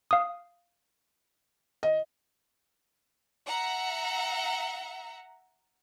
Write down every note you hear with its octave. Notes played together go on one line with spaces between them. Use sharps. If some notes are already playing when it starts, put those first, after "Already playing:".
F5 D#6
D#5
E5 F#5 A#5